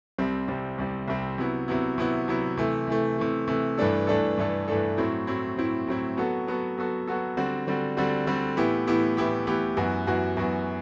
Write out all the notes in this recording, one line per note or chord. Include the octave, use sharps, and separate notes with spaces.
C2 C3 G3 C4
C2 C3 G3 C4
C2 C3 G3 C4
C2 C3 G3 C4
C3 F#3 B3 E4
C3 F#3 B3 E4
C3 F#3 B3 E4
C3 F#3 B3 E4
C3 E3 A3
C3 E3 A3
C3 E3 A3
C3 E3 A3
G2 E3 A3 D4 A4
G2 E3 A3 D4 A4
G2 E3 A3 D4 A4
G2 E3 A3 D4 A4
A2 F#3 C4 E4
A2 F#3 C4 E4
A2 F#3 C4 E4
A2 F#3 C4 E4
F#3 B3 F#4 A4
F#3 B3 F#4 A4
F#3 B3 F#4 A4
F#3 B3 F#4 A4
D3 G3 C4 F#4
D3 G3 C4 F#4
D3 G3 C4 F#4
D3 G3 C4 F#4
A2 E3 B3 E4 G4
A2 E3 B3 E4 G4
A2 E3 B3 E4 G4
A2 E3 B3 E4 G4
F#2 E3 B3 F#4
F#2 E3 B3 F#4
F#2 E3 B3 F#4